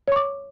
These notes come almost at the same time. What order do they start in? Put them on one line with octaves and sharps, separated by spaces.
C#5 C#6 D6